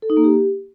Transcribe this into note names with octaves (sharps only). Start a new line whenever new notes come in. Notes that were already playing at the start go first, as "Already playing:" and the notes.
A4
D#4
A#3
G4